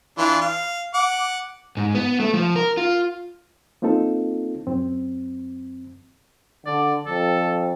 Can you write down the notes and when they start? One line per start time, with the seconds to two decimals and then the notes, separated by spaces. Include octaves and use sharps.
0.18 E3 D4 F4
0.41 F5
0.94 F#5 D6
1.77 G#2
1.95 B3
2.20 A3
2.34 F3
2.56 A#4
2.77 F4
3.82 A#3 C4 D#4 F4 A4
4.67 F#2 C4
6.66 D3 D5
7.06 F2 A4